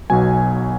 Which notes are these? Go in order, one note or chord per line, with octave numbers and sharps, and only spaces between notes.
B1 B2 F#3 G#5